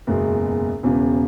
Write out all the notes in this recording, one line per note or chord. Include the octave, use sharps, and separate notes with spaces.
F#1 E2 B2 G#3
E1 E2 C#3